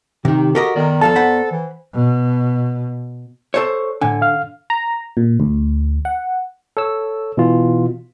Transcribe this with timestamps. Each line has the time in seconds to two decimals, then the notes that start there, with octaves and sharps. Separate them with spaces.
0.25 C3 D#3 D#4 G4
0.55 F#4 G4 A4 A#4 D#5
0.76 D#3 B3 D5
1.01 F3 A4 F5 A5
1.16 C5 F#5 B5
1.51 E3
1.93 B2
3.54 A4 C5 C#5
4.01 A2 D3 G#5
4.22 F5 F6
4.70 A#5
5.17 A#2
5.40 D2
6.05 F#5
6.77 A4 C#5 E6
7.37 B2 E3 F4